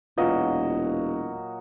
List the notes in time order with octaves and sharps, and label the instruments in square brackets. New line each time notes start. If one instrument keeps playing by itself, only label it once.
[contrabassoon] E1 [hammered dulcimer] A#2 F#3 D#5 [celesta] F4 B4 F5